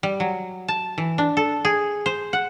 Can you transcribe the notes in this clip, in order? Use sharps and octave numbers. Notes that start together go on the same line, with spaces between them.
G3
F#3
A5
E3
D4
A4
G#4
C5
F#5